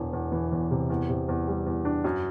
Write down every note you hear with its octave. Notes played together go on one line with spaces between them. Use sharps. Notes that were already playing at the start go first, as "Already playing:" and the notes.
Already playing: E1 E2
E2
E3
E2
C3
E2
C3
E2
G3
E2
D4
F#2